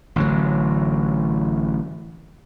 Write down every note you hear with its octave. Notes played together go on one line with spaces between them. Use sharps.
A1 D3 F#3